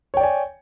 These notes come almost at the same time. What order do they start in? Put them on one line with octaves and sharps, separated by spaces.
C#5 G5 D5 G#5